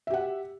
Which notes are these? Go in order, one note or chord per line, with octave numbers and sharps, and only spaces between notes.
G4 E5 F#5